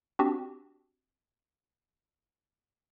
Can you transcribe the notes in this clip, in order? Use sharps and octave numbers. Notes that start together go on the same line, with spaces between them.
C4 D4 F#4 G4